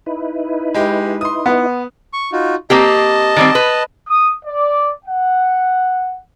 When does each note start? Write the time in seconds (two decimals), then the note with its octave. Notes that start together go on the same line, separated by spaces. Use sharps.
0.06 D#4 E4 B4
0.74 G#3 G4
1.21 C6 D#6
1.46 B3
2.13 C#6
2.32 D#4 F4 F#4
2.70 A#3 C4 G4 D#5 A5
3.36 D#3 G3 C4
3.55 B4
4.09 D#6
4.45 D5
5.05 F#5